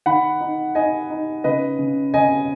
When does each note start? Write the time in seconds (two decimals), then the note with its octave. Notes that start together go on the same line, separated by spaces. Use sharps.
0.06 D#3 F#5 B5
0.41 D#4
0.75 D#4 D#5 G#5
1.10 D#4
1.44 C#3 B4 D#5
1.79 C#3
2.14 C#3 D#5 G#5